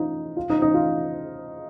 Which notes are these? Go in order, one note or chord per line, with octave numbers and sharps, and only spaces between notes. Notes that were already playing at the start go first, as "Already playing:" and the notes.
Already playing: D#4 F4
F4
D#4
D#4
F4